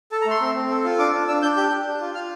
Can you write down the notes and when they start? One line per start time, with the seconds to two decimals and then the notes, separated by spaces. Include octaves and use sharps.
0.12 A4 A5
0.22 A#5
0.26 A3 C6
0.41 C4
0.55 C4
0.70 A4
0.84 F4
0.99 D4 D6
1.13 D4
1.28 D4 E6
1.42 D4 G6
1.57 G4 G6
1.72 G4
1.86 D4
2.01 F4
2.15 F4 F6